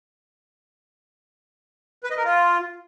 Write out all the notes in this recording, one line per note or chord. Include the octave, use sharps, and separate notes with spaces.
B4
D#5
A#4
F4